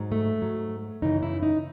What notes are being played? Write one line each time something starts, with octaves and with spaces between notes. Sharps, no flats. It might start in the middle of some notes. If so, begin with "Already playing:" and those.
Already playing: G#2 F#3
A3
G#2 F#3
F#2 C#3 E3 D#4
E4
D#4